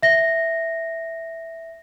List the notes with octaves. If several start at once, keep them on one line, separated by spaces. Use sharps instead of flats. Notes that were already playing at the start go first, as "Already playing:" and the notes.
E5 A#6